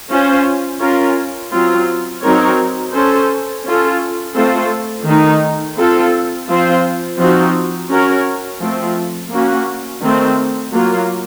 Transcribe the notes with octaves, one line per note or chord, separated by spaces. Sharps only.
C#4 F4 C5
C#4 F4 A#4
F#3 C4 F4
F#3 C4 D#4 A#4 C#5
C#4 A4 C5
C#4 F4 A4
A3 C4 F4 A4 C5
D#3 A3 D#4
C4 F4 A4
F3 C4 F4 C5
F3 C4 D#4 F#4
C#4 F#4 A#4 C#5
F3 A3 C4
A#3 C#4 F#4
D#3 A3 C4
F#3 A#3 F4